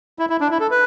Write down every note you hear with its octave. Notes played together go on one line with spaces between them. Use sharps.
E4
E4
D4
E4
A4
B4